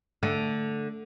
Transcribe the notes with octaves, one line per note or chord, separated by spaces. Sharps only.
D3 A3